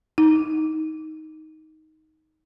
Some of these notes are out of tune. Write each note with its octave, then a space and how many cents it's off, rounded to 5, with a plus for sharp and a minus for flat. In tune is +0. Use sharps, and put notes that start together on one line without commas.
D#4 +10